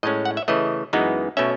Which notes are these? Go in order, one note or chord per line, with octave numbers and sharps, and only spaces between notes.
A2 G#3 C#4 D#5
F#5
E5
C#3 E3 A3 D#5
F#2 E3 G#3 B3 D#4
B2 A3 C#4 E5